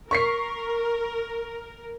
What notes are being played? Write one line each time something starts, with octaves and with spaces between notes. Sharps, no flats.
A#4 C#6 B6 C7